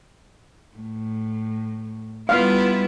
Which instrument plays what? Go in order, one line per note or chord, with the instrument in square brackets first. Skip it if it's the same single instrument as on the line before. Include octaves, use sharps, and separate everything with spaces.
[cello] A2
[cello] G3 E4 [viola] B3 F4 [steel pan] F5